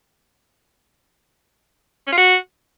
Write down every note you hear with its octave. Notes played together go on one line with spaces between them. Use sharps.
C#4
F4
F#4